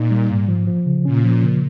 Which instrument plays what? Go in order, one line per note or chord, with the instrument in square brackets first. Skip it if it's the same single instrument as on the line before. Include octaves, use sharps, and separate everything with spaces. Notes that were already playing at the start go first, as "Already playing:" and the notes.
Already playing: [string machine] A#2 [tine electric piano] D#4
[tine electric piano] G3
G#2
F3
F3
C#3
[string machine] A#2 [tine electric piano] C#4
[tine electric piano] F3
C#3